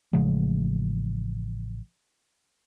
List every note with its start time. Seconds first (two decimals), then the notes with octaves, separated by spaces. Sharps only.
0.13 A1 C#3 F3 G#3